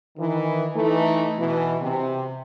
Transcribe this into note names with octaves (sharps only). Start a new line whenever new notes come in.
D#3 E3
E3 A3 D#4
B2 E3
C3